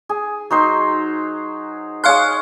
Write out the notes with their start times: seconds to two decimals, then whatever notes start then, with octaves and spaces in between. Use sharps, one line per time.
0.09 G#4
0.50 F#3 D#4 C5
2.04 G#4 C#5 F5 C6 F6 F#6